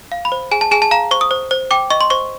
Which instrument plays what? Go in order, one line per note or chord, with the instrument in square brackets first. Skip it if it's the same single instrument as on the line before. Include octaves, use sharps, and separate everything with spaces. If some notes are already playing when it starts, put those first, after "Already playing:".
[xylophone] F5
B5
C5
G#4 G#5
A5
G#4 G#5
A5
F5 A#5
C5 C#6
D#6
C5
C5
G5 D6
D#5 C#6
C6
C5 C#6